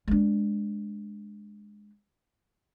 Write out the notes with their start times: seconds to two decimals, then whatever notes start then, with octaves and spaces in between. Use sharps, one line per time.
0.08 G#3 D4